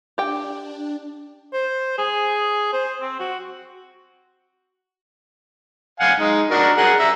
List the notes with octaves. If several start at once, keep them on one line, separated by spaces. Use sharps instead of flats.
D4 G4 G5
C5
G#4
C5
C4
F#4
F5 F#5 G#5
G#3 D#4
D4 F#4 A#4
G#4 A#4 F#5
E5 A#5